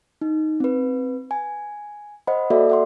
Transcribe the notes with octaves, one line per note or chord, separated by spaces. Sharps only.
D#4
C4 B4
G#5
C5 D#5 F#5 B5
A#3 F#4 A4 D5 E5
E5 F#5 C6